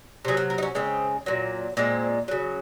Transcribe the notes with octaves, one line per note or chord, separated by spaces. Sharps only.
C3 F#3 G#4
A#4
A#4
D#4
C#4
C#3 G#3 C4
A#2 F#3
A#2 G#3 C4
C#3 F#3